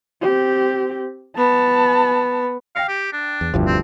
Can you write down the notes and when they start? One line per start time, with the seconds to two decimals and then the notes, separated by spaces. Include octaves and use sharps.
0.22 C4 G4
1.36 B3 A5
2.76 F5 G5 A#6 C#7
2.88 G4
3.13 D4
3.41 E2
3.54 F1 D2 G2 F3 E4 G4
3.67 C4